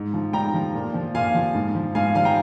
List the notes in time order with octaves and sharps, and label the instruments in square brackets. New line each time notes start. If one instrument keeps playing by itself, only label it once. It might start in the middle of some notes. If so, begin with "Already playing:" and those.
Already playing: [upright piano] G#2
F3
G#2 G5 A#5
F3
A#2
F3
A#2 F5 G#5
F3
G#2
F3
G#2 F5 G#5
F3 F5 G#5
G5 A#5